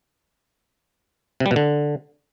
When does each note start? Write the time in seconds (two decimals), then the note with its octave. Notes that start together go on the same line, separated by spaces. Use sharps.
1.40 C3
1.46 G3
1.51 B2
1.56 D3